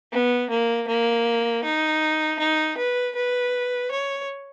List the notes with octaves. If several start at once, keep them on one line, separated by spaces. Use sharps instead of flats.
B3
A#3
A#3
D#4
D#4
B4
B4
C#5